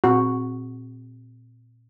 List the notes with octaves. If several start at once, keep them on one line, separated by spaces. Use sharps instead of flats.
A#2 C4 F#4